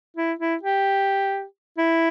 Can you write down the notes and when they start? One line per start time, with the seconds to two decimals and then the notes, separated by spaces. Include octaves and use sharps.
0.17 E4
0.39 E4
0.63 G4
1.78 E4